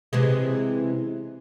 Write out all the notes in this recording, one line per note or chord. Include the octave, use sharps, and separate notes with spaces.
C3 E3 G#3